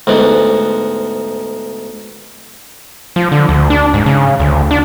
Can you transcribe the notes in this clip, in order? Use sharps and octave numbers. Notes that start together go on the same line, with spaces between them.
D2 G#2 B3
F3
D3
D2
D4
G#2
C#3
D2
D4